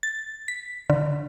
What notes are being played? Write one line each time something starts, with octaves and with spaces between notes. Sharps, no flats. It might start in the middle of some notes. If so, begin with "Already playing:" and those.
A6
B6
D3